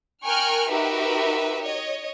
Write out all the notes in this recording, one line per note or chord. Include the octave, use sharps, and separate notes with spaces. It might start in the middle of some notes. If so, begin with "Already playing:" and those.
A#4 G5 G#5 C#6 F6 F#6
D#4 F#4 G4 A#4 B4 E5
C#5 D#5